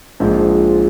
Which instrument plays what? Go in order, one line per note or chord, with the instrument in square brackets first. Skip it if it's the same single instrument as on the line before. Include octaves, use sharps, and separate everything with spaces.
[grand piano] A#1 G#2 F3 G#3